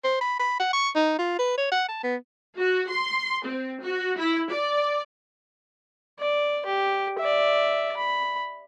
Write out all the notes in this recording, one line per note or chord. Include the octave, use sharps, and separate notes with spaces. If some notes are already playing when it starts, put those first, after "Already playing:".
C5
B5
B5
F#5
C#6
D#4
F4
B4
C#5
F#5
A5
B3
F#4
C6
C4
F#4
E4
D5
D5
G4
D5 E5
B5